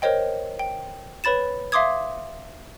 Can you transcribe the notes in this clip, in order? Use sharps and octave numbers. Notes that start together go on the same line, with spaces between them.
A#4 C5 C#5 D#5 G5
G5
B4 C#5 B5 A6 E7
E5 F5 C6 D6 D#6 G#6